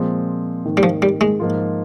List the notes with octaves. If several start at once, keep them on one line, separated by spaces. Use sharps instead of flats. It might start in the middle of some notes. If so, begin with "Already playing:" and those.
Already playing: A#2 F3 G#3 C4
G#2 D#3 A#3
G3
F3
G3
G#3
G#2 F3 A#3 F4